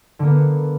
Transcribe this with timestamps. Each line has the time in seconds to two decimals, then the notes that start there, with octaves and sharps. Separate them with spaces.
0.19 D3
0.23 A#3
0.27 B3